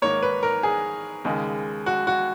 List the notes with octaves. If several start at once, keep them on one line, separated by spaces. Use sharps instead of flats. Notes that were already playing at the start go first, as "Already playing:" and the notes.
G#2 D#3 A#3 C#5
B4
A#4
G#4
D#2 C#3 G#3
F#4
F#4